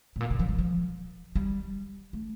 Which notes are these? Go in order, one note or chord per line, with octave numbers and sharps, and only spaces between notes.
A2
A#2
C3
F3
G3
F3
G3
A3